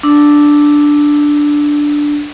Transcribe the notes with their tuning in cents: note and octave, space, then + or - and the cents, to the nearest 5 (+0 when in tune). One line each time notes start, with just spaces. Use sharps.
D4 +0 E6 -5